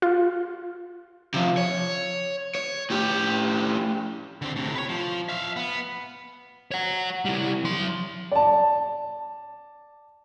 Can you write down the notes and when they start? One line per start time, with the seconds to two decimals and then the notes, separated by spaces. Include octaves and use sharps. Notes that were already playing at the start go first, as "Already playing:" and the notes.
0.02 F4
1.34 C3 F3
1.57 C#5
2.55 C#5
2.90 A2 G4
4.42 D3 C4
4.56 A2 C3
4.75 B4 C#5
4.89 F3
5.29 E5 F5
5.56 B3
6.71 C#5 F#5
7.25 G3 E4
7.64 F#3 C6
8.32 D5 A5